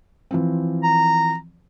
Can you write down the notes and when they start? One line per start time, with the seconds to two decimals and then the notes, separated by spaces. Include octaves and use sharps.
0.31 E3 F3 C4
0.83 A#5